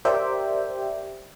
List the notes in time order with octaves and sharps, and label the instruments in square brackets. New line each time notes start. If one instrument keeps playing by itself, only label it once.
[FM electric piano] G4 A#4 C5 D5 E5 G5